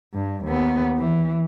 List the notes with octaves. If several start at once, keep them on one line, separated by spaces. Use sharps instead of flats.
G2
D#2 B3
E3